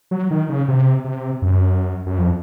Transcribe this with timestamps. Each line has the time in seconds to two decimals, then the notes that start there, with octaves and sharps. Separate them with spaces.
0.11 F#3
0.31 D#3
0.49 C#3
0.68 C3
1.05 C3
1.42 F#2
2.06 F#2
2.18 F2